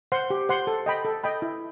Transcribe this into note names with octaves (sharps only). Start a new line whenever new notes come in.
C5 F#5 C6
G4
C5 F#5 C6
A4
D#5 G5 B5
A4
D#5 G5 B5
E4